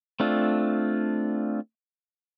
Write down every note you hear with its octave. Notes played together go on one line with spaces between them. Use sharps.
A3 C4 D4 F4